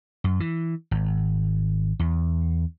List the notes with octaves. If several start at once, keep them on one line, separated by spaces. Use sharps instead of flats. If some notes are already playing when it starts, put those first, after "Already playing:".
F#2
E3
G#1
E2